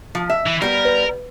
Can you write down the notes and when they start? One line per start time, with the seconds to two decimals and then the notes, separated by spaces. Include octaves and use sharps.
0.15 F3
0.30 E5
0.47 E3
0.62 G3 B3 A#4
0.85 B4